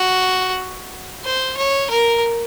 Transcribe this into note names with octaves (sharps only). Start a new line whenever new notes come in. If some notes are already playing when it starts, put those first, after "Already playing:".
Already playing: F#4
C5
C#5
A#4